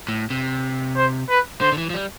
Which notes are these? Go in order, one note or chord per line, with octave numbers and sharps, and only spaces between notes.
A2
C3
C5
B4
D3 C5
D3
E3
F3
G3